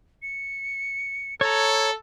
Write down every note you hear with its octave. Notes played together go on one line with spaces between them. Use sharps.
C#7
A4 C#5 A#5 G#6